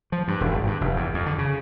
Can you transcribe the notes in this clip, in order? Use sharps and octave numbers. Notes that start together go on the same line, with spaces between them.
F3
G2
E1
G#1
G2
F1
E2
F2
D3
C#3